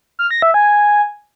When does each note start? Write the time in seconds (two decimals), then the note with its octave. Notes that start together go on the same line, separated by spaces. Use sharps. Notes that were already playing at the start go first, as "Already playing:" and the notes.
0.19 F6
0.31 A#6
0.42 E5
0.54 G#5